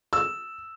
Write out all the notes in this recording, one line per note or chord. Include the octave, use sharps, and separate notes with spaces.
E6